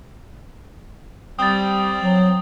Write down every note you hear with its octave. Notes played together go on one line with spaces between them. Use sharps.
G3 C4 D#6 A6
F#3